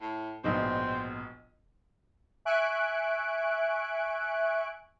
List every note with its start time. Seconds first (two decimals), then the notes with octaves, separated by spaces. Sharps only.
0.02 A2
0.44 A#1 G#2 B2 C4
2.45 E5 G#5 C#6 F#6 D7